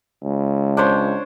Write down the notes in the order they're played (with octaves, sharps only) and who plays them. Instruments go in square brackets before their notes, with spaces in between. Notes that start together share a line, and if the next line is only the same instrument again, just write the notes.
[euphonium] C#2
[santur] D4 C5 C#5